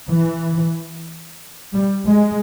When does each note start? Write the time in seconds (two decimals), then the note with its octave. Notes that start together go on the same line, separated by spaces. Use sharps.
0.09 E3
1.74 G3
2.07 G#3